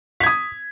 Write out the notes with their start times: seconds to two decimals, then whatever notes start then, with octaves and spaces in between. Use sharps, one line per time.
0.20 B6
0.23 G#6
0.26 D#6